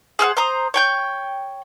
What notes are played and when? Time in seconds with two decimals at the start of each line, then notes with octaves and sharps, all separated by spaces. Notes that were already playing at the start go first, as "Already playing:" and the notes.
0.19 G#4 C5 F5 F#5
0.37 C5 A#5 D#6
0.74 C#5 G5 G6